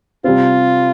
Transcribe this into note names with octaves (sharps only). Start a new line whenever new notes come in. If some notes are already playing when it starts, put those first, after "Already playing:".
C3 G3 C4 F4